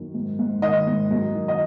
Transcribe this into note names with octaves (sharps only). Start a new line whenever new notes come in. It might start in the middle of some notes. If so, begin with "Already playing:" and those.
Already playing: F#2 D#3
G#2
G#2
D#3 D#5
G#2
F#2
D#3
D#5